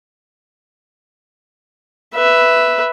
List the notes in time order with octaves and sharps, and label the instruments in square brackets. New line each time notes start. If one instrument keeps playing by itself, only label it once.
[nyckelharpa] B4 E5